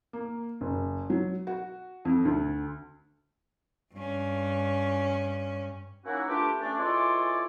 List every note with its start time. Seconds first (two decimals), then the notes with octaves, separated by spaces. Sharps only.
0.13 A#3
0.61 F#1
1.10 F#3
1.47 F#4
2.05 F2
2.25 D2
3.94 G2 C#4
6.04 F#3 A#3 C#4 D#4 E4 F#4
6.28 A3 B3 D4 F4 G4
6.60 A3 C#4 D4
6.77 E3 G#3 F4 A4 C#5 D5